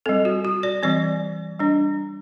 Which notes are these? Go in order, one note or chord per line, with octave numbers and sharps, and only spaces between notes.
G3 C4 A4
F#4
F#4
D5
E3 G3 C4 D5
G3 D4